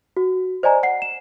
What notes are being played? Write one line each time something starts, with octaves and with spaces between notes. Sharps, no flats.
F#4
C5 D5 D#5 G#5 A#5
F#5 C7
E7